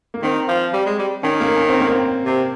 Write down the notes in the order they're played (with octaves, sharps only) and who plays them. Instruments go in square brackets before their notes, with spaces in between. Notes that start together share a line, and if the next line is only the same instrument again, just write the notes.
[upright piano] A#3
[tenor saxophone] D#3 [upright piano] C4
[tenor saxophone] F3
G3
G#3
G3
[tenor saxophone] D#3 [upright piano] C#4
[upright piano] A#3
C#4
C4
A#3
C4
[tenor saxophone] C3